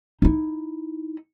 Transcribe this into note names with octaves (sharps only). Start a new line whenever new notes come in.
D#4 E4